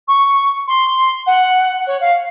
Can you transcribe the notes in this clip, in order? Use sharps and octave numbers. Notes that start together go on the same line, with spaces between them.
C#6
C6
F#5
C#5
F5